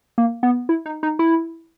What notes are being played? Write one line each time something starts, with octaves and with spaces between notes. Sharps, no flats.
A#3
B3
E4
D#4
D#4
E4